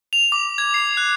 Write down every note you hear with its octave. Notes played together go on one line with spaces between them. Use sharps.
F7
D6
G#6
C7
F#6